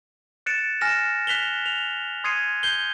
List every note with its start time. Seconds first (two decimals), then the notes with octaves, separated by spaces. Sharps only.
0.46 F#6 A6 C#7 D7 E7
0.81 G#5 F6 A#6 E7
1.27 F#6 B6 F7 G7
1.66 F7
2.24 C6 D#6 G#6 C7 C#7 D#7
2.63 G6 C7 G7